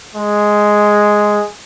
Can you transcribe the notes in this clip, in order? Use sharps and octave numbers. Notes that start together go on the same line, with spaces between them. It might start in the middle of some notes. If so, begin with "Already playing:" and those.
G#3